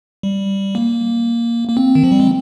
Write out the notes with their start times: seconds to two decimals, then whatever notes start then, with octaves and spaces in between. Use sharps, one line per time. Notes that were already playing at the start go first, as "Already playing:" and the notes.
0.23 G3
0.75 A#3
1.69 A#3
1.77 C4
1.95 D#3
2.04 F3
2.12 G3
2.20 G#3